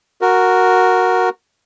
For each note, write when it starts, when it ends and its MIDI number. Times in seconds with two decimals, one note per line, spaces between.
0.21 1.29 66
0.21 1.29 70